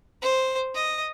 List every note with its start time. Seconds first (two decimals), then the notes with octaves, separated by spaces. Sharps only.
0.22 C5
0.75 D#5